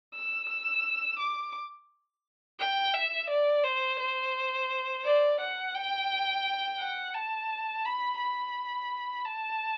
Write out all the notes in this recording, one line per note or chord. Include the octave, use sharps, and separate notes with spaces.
E6
E6
D6
G5
E5
D5
C5
C5
D5
F#5
G5
F#5
A5
B5
B5
A5